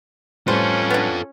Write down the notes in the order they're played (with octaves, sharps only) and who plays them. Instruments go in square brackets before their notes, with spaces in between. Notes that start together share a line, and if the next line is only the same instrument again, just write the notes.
[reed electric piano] A2 G3 B4 [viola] C#4 [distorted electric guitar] F4 A4 [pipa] C5
[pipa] B3 D4